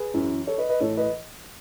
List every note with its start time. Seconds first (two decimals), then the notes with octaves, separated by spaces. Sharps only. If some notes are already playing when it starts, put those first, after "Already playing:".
Already playing: G#4 B4
0.14 F#2 E3
0.47 A4 C#5
0.58 B4 D#5
0.69 B4 D#5
0.80 A2 E3 A4 C#5
0.97 B4 D#5